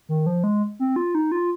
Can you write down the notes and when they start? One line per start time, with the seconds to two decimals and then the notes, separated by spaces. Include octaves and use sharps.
0.09 D#3
0.26 F3
0.44 G#3
0.80 C4
0.96 F4
1.15 D#4
1.32 F4